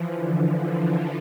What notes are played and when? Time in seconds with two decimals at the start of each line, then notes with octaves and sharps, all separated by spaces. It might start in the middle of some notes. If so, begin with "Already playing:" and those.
Already playing: E3 F3
0.13 D3
0.58 E3